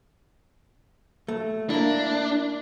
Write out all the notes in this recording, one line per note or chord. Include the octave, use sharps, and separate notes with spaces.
A3
A#3 D4 E4